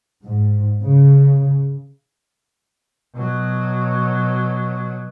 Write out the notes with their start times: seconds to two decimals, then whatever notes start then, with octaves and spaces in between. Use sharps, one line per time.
0.25 G#2
0.84 C#3
3.15 B2 F#3